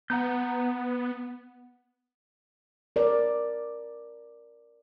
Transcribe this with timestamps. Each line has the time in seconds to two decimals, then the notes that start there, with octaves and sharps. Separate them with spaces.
0.10 B3 F#5 A#5 G6
2.96 A#4 D5